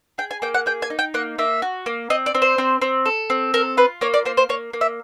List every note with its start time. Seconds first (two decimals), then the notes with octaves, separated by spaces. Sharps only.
0.18 G#4 G5
0.31 G#5
0.42 A#3 G5
0.54 F#5
0.66 G#4 G5
0.82 G#5
0.90 D#4
0.99 G5
1.14 A#3 F#5
1.38 A#3 E5
1.62 F#4
1.86 A#3
2.10 C4 D#5
2.26 D5
2.35 C4
2.42 C5
2.58 C4
2.82 C4
3.06 A4
3.30 C4
3.54 A4 A#4
3.77 F4 B4
4.01 A#3 C#5
4.14 D5
4.25 A#3 C5
4.37 C5
4.49 A#3 C#5
4.73 A#3
4.81 E5